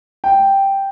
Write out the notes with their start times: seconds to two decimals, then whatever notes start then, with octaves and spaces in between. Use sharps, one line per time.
0.24 G5